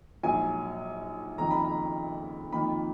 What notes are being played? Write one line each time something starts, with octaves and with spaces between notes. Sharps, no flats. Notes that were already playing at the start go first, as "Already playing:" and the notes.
A#1 G#2 F#3 G#5
F#1 F2 D#3 A#5
B5
A#5
F2 D#3 A#3 B5